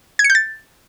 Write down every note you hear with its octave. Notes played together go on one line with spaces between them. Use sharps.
G#6
C#7
G6
A6